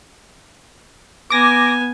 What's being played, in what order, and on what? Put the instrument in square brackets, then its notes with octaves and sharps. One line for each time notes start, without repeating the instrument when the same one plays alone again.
[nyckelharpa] B3 G#5 [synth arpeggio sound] D6 A#6